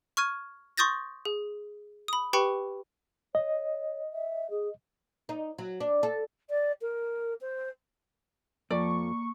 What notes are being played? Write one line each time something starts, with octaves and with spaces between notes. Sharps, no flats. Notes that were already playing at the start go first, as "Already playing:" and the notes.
C#6 F6 G#6 D#7
C6 C#6 D#6 G6 A6 A#6
G#4
B5 D#6
G4 B4 G5 B5 C#6 C#7
C#5 D#5
E5
G#4
D#4
F#3
D4
A4
D5
A#4
C5
F2 F3 A#3 D5 C#6